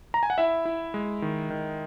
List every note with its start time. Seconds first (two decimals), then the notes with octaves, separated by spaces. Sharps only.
0.14 A#5
0.23 G#5
0.30 F#5
0.38 E4 E5
0.65 E4
0.94 G#3
1.22 D#3
1.50 D#3